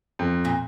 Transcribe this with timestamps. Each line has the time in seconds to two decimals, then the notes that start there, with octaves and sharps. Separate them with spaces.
0.19 F2
0.45 A#2